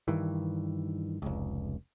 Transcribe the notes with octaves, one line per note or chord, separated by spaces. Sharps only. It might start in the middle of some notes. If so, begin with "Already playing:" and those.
G2 D#3 E3
F1 C#2